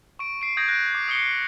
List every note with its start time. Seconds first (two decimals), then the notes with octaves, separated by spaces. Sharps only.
0.19 C#6 D7
0.42 C7 D7
0.57 D#6 G6 G#6 A#6 D7
0.68 F#6 A#6 D7
0.95 D6
1.08 D#6 C7 C#7 G7